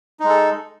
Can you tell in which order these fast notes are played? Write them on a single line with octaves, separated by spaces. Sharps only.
D#4 G#3 A4